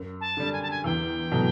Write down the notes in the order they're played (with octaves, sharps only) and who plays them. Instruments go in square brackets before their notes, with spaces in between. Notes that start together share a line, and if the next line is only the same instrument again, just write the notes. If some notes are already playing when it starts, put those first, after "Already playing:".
Already playing: [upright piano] F#2
[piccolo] A5
[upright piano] D3 G3
[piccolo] G#5
A5
G#5
[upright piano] E2 [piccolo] G5
[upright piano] B2 F#3 A3